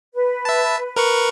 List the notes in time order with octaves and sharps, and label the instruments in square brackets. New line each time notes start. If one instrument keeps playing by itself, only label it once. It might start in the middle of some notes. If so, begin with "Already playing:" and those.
[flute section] B4
[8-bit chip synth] E5 A5
A#4 B4 C#6